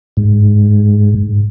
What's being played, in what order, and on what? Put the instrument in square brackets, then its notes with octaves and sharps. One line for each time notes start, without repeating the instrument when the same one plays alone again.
[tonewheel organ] G#2